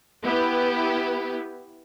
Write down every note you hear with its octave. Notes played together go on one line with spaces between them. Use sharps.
B3 E4 G4 B4